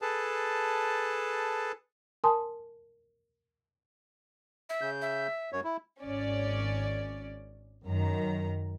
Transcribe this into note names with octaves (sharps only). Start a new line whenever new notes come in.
G#4 A4 B4 A5
A#4 G#5 A5 C6 D#6
E5
C#3 G6
E5
F#2 C#5
E4
G#1 C#4 D5
F#2 D#3 A#5